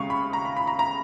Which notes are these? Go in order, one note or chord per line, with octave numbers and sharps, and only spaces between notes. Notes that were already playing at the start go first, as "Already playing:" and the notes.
Already playing: F1 D#2 C#3 G#3 F5 C#6
B5
A#5
B5
B5
A#5
A#5